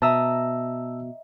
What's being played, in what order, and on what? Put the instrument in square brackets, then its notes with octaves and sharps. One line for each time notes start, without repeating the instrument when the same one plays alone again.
[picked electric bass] B2 [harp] D#5 E5 A#5 [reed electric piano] A5 E6